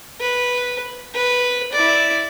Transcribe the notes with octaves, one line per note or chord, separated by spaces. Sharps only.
B4
B4
E4 D5